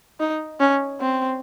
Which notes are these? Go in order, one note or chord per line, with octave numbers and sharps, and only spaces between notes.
D#4
C#4
C4